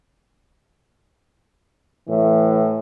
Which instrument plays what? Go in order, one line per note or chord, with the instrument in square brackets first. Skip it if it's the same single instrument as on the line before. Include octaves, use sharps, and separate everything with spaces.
[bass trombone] A2 [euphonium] E3